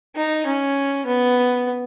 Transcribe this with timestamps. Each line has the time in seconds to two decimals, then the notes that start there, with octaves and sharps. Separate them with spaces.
0.17 D#4
0.46 C#4
1.06 B3